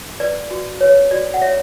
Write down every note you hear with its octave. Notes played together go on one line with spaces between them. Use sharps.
B4 D5
F#4
B4 C#5
F#4 D5
F#5
C#5 E5